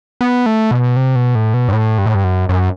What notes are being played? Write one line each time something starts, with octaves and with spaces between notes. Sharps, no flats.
B3
A3
B2
C3
B2
A2
B2
G2
A2
G2
A2
G2
F#2
F#2